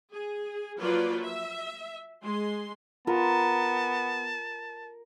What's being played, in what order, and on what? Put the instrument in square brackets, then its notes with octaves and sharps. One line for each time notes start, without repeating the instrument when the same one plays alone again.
[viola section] G#4
F3 F#3 A#3 F4 B4 D5
E5
G#3 C6
[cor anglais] B3 [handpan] F4 [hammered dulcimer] A#4 [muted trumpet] A5